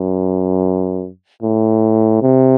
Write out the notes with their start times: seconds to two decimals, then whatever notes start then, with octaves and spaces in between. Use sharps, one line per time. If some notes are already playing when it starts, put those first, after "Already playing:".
Already playing: F#2
1.42 A2
2.22 C3